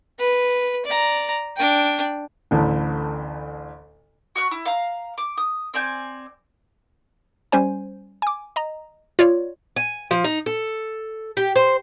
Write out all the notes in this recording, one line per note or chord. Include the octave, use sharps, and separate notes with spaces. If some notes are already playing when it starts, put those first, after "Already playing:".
B4
D5 A#5
D4 G5
A1 D2 A2
F#4 C#6 F#6
E4
F5 A#5
D6
D#6
C4 D5 G#5 G6
G3 C#4 C5 G#5
G#5 D6
D#5 A#5
F4 C#5 D5
G#5
F3
D#4
A4
G4
C5